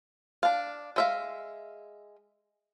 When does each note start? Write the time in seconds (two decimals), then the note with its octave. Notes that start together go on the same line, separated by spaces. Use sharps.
0.43 D4 F5
0.96 G#3 E5 F5